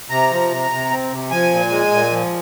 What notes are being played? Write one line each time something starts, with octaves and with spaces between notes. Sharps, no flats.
C3 A#5
F3
C3
C3
C4
C3
F3 G#5
A#2
G#3
A#2
F3